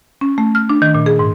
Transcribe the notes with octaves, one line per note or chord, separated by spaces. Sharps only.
C#4
A3
F6
D4
D#3
A#2
G#4
G#2